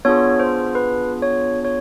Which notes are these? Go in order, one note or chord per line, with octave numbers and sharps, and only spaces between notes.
B3 D4 F4 G#4 C#5
C5
B4
C#5
C#5